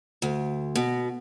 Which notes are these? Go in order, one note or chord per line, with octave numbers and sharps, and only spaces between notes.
D2
B2